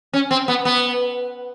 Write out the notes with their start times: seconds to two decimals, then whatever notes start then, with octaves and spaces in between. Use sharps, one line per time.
0.13 C#4
0.31 C4
0.48 B3
0.65 B3